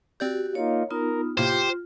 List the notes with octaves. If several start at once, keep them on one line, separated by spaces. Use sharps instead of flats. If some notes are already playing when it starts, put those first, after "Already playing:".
C4 F#4 G4 D5 G6
A#3 D#4 F4 C#5
B3 D#4 F4 A#4
A2 C3 A#3 F4 G4 C5